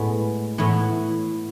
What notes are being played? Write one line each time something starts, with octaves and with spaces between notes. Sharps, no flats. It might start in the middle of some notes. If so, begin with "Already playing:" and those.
Already playing: A2 G#3 B3
A2 E3 B3